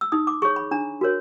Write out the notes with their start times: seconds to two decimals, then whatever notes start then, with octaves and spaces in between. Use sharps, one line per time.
0.01 E6
0.12 D#4 D#6
0.27 D6
0.42 G#4 C#5 C#6
0.56 B5
0.71 D4 A#5
1.01 F#4 A#4 C#5